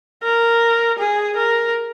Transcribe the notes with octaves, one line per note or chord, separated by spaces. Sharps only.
A#4
G#4
A#4